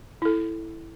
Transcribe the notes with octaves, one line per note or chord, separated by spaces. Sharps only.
E4 A4